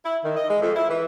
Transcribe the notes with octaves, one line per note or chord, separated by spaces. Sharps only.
E4
D#3
D#5
G#3
F2
E4
E3